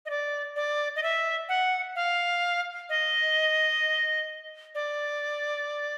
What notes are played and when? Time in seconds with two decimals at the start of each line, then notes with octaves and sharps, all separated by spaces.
0.06 D#5
0.10 D5
0.56 D5
0.96 D#5
1.03 E5
1.49 F#5
1.96 F5
2.89 D#5
4.75 D5